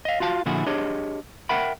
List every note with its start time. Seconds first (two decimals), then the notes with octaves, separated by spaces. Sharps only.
0.05 D#5 F5
0.20 F4 F#4 F5 A5
0.46 A#2 D3 F3 E4 F#4 G#4
0.66 D4 G4 G#4 C#5 D#5
1.49 A#4 E5 F#5 G5 B5